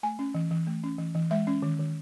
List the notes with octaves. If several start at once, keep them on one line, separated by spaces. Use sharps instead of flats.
A3 G#5
C#4
E3
E3
A3
C#4
E3
E3
G#3 E5
C#4
D#3
D#3